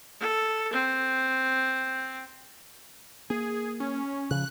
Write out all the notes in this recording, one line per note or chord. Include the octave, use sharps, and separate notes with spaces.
A4
C4
A#3 G#4
C#4
C#3 F3 F#6